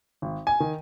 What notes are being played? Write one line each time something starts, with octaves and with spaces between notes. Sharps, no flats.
G#1
G#5
D#3